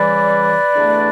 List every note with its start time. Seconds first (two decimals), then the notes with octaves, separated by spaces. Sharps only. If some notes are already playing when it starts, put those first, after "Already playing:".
Already playing: C#3 E3 G3 B4 D5
0.74 E2 D3 A3 D4